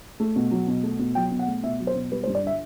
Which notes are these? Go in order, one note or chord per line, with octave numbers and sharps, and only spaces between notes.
A3
B2
F#3
B2
A3
B2
F#3 G5
B2
F#5
A3
B2 E5
F#3
C5
B2
G3 B4
C5
G2
D5
D3 E5